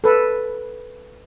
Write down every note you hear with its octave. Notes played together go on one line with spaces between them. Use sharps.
A4 B4